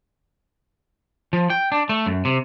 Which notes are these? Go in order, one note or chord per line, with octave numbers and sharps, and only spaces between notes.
F3
G5
D4
A3
F#2
C3